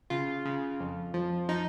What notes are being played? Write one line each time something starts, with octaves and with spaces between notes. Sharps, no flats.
C#3 F4
C#3
F2
F3
F3 D#4